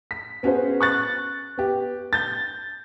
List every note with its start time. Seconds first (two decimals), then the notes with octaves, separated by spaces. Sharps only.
0.11 B6
0.43 B3 C#4 F#4 G#4 C5
0.81 C#6 F#6 A6
1.58 B3 G4
2.13 G6 A6